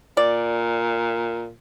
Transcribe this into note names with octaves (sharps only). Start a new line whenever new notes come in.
A#2 D5